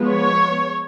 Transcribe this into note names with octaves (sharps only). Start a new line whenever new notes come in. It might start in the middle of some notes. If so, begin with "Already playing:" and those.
Already playing: F3 G#3 B3
C#5